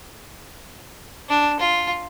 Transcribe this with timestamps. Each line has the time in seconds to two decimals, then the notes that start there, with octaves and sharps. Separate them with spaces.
1.29 D4
1.60 F4